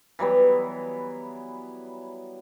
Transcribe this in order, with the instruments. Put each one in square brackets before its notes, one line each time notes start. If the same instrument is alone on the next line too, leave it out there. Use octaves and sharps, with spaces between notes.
[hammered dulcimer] E3 F#3 G3 B3